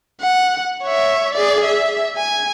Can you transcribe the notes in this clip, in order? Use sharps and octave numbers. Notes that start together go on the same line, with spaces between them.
F#5
C#5 E5
G#4 D5
E5
G#5